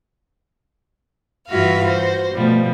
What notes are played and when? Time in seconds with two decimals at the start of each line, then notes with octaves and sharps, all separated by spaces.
1.48 G2 E3 F4 F#4 E5 F5
1.84 F#4 C5
2.34 B2 F3 G3 A3